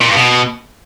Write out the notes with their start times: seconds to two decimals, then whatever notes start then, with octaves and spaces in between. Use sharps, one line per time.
0.01 A#2
0.08 G2
0.16 B2